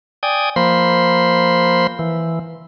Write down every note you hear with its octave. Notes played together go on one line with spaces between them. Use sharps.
D5 G5 G#5 D#6
F3 A#3 C5 B5 C6
E3